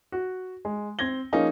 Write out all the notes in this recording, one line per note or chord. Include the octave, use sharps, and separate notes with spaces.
F#4
G#3
C4 G#6 A#6 G7
F3 A#3 C#4 D#4 G#4